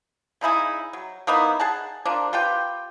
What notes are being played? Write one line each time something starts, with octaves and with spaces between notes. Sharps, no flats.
C#3 D#4 E4 G#4
F#3
A#3 B3 D#4 E4
G#4 F#5 A5
F3 A#3 D4
F4 G4 B4 G5